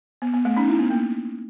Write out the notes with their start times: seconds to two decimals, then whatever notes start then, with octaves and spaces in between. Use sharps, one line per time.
0.22 B3
0.33 B3
0.45 A3
0.57 C#4 D#4
0.68 D4 E4
0.79 B3
0.90 A#3